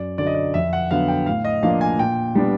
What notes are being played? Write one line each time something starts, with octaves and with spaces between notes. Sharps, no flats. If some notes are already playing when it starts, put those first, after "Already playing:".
Already playing: F#2 D5
D3 F#3 D5
D#5
D5
F2 E5
F#5
D3 F#3 B3 F5
G5
A2 F5
D#5
F3 A#3 D4 F5
G#5
A#2 G5
G3 B3 D4